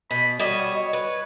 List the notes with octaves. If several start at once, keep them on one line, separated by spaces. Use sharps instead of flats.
B2 B5
G3 F#4 C#5 D#5
B4